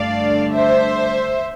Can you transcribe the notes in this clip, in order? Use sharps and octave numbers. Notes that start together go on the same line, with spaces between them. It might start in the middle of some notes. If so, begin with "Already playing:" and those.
Already playing: G2 D3 A3 D4 D5 F5
C5 E5